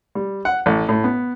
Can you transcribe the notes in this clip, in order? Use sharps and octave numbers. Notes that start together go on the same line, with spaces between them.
G3
F#5
A1
A2
B3